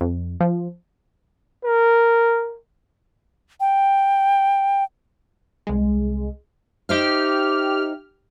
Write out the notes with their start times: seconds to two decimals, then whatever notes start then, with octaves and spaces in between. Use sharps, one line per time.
0.01 F2
0.40 F3
1.64 A#4
3.60 G5
5.67 C2 G#3
6.89 D#4 G4 C5 E5 F6